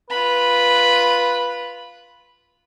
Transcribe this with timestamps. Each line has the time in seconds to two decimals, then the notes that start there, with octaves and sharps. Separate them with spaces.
0.10 F4 B4 B5